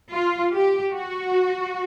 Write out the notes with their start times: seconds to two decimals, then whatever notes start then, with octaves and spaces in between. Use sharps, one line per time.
0.13 F4
0.53 G4
0.94 F#4